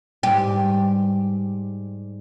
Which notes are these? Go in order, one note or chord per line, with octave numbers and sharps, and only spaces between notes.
G#2 G3 G4